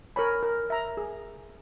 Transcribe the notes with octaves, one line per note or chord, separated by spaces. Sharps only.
A#4 C#5 G#5 B5
A#4
E5 A#5
G#4